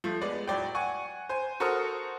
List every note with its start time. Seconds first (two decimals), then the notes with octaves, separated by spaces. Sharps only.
0.04 F3 A3
0.21 G#3 B3 D5
0.47 A2 F#3 D5 G5
0.75 F#5 G#5 C#6
1.29 C5 G#5
1.60 F#4 A4 A#4 C5 D#6 F6